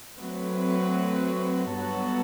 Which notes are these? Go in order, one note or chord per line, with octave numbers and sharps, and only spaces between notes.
F#3 A3 C4 F#4 B4
G2 F#3 B3 F#4 A4